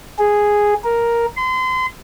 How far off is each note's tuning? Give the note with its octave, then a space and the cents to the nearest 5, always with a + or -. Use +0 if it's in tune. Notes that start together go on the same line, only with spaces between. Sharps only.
G#4 -5
A#4 +5
C6 -35